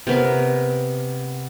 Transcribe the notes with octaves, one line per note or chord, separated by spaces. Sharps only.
C3 B3 A#4